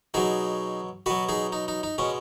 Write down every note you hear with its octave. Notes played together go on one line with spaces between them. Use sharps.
B2 F#3 D#4 G#4
B2 F#3 F#4 B4
D#4 G#4
D#4
D#4
D#4
B2 G#3 C#4